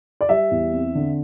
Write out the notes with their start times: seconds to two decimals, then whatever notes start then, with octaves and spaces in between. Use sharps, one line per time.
0.21 D5
0.29 G3 E5
0.51 E2
0.74 C4
0.95 D3